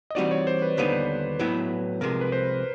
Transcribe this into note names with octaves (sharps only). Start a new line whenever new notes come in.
D#5
E3 G3 C4 D#4 F#4 D5
C#5
C5
B4
D#2 D3 G3 B3 D#4 B4
A2 F#3 B3 E4
C2 C3 F3 G#3 A#4
B4
C5